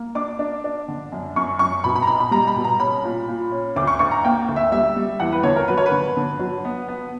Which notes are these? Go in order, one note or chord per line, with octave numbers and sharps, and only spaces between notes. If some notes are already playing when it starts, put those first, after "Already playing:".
Already playing: A#3
D4 D6
D4
D4
D3
F#2
F#2 C#6
F#2 C#6
B2 B5
B5
A#5
B1 B5
B5
G3 A#5
B5
B2
A#5
C#4 B5
A#2
A#2
C#4
D2 D6
C#6
D2 C#6
A#5
A#3 G5
D2
E5
G3 E5
G3
E2 F#5
B4
D3 C#5
A#4
F#3 B4
C#5
B4
D3
D3
F#3
B3
B3